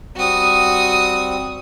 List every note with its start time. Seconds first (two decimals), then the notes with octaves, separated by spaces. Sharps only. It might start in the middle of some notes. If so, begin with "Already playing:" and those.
0.16 G3 C4 F#4 D#6